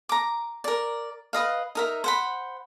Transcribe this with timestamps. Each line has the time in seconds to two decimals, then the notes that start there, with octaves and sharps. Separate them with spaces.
0.09 A#5 D6
0.64 A#4 D5
1.33 B4 D#5 F5
1.75 D#4 A#4 E5
2.04 C5 F#5 B5